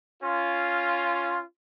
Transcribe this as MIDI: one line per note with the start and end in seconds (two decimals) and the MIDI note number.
0.23 1.42 61
0.23 1.42 65